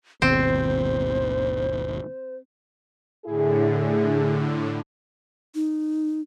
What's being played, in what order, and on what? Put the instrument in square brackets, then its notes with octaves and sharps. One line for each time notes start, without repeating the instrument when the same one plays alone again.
[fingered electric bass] G#1 D#2 B2 [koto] C4 [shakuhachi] C5
[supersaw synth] A2 D3 [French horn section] E4 G#4
[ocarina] D#4